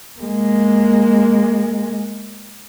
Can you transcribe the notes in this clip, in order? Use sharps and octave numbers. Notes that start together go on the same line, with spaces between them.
G#3 A#3